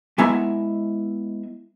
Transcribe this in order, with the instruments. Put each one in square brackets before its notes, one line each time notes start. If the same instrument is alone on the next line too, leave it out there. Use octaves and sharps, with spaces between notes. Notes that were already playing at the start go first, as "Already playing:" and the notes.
[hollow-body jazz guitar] G#3 B3 E4 E5 G#5 A#5